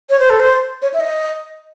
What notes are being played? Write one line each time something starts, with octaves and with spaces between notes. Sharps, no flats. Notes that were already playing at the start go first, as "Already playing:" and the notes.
C#5
C5
A4
C5
C#5
E5
D#5